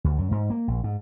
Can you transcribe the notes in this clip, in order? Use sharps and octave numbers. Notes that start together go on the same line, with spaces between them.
D2
F#2
G#2
A#3
A#1
G#2